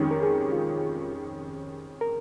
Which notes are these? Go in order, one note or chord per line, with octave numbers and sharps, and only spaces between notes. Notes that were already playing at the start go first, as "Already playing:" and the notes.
Already playing: F2 D#3 G#3 C#4 G4
A#4
G#4
F4
A#4